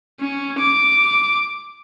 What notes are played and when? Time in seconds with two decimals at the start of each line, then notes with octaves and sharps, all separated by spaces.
0.20 C#4
0.59 D6